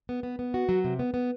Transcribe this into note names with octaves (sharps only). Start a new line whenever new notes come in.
B3
B3
B3
F#4
F#3
C3
B3
B3